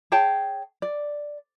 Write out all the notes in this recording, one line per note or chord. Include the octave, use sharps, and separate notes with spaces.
G#4 C#5 G5 A5
D5